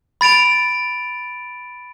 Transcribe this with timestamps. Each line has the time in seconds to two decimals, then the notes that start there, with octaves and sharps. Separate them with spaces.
0.21 B5 A6 D7 F7